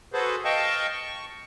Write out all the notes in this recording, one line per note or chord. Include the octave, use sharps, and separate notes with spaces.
F#4 G#4 A4 B4 C5
D#5 F5 G5 A5 C#6
C#6